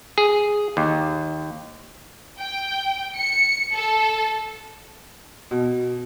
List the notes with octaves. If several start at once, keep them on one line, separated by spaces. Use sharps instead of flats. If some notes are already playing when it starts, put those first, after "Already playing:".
G#4
D#2
G5
C#7
A4
B2